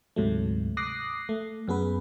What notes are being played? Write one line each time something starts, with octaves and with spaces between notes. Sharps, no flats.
D2 G#2 C3 F#3 A3
D6 D#6 F#6 A#6 C7
A3
F#2 B3 G#4 B4